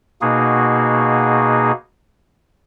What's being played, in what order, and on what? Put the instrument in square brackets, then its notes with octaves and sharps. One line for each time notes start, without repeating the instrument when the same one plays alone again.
[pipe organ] B2 A#3 D#4 F#4 G#4